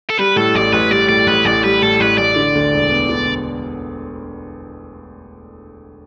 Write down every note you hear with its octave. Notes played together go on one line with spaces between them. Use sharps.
A4
G3 B4
A2 A4
A1 D5
A1 B4
G3 D5
A2 D5
A1 B4
A1 D5
G3 B4
A2 A4
A1 B4
A1 D5
D3
D2
E1
B3
D3